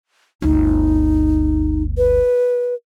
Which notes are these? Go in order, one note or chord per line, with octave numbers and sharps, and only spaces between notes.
G1 D2 D#4
B4